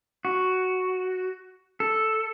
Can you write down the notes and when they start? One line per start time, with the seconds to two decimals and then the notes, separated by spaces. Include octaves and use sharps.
0.25 F#4
1.80 A4